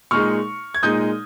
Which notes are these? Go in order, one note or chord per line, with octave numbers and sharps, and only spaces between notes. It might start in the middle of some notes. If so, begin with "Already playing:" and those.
A#2 G#3 D#4 C#6 F6
G#6
A#2 G#3 D#4 D#6 G6